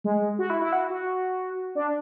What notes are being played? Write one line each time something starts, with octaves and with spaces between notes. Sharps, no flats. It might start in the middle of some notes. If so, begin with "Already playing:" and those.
G#3
F#4
E4
E4
F#4
F#4
D4